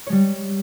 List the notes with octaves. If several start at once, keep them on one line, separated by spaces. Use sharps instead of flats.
G3 G#3 C#5